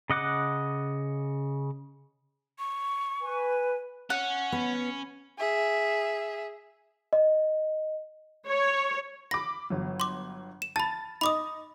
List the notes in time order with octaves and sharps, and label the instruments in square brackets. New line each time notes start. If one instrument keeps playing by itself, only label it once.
[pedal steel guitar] C#3 D#5 F#5 D6 F#6
[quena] C#6
[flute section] B4 G#5
[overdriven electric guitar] C#4 [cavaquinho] F#5
[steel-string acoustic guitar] B3
[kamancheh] G#4 E5
[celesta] D#5
[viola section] C#5
[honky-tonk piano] B5 D6 [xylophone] A#6
[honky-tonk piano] G1 F#3
[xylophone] C6 D6
E7
[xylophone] A5 B5 [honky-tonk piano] A6
[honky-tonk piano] D#4 D#5 [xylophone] B5 D6 D#6